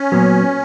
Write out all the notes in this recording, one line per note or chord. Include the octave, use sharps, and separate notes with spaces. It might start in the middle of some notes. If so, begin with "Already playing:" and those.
Already playing: C#4
A#2 F#3 B3